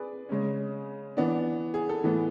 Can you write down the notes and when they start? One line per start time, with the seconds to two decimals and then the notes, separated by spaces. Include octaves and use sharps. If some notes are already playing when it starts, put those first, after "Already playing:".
Already playing: G#4 B4 D5
0.29 C#3 G#3 C#4
1.17 E3 B3 D4
1.74 G#4
1.89 A4
2.04 A2 E3 B3